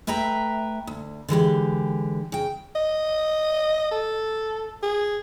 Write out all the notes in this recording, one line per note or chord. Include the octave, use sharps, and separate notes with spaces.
A3 B4 E5 G5 A#5
D2
D3 E3 G#3 G4
C#3 G5
D#5
A4
G#4